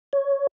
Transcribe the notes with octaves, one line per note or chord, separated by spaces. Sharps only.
C#5